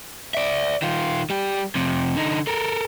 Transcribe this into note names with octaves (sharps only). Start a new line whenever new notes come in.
D5 E5
D#3 F4
G3 G4
F2 C3
D3 D#4
A4 A#4